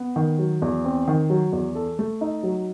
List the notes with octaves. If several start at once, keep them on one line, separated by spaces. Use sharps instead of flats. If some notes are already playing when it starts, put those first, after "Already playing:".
Already playing: B3
D#3
F#3
E2
C4
D#3
F#3
E2
A4
A3
D#4
F#3